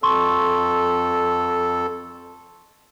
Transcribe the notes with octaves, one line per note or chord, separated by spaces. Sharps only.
F2 A4 C6 C#6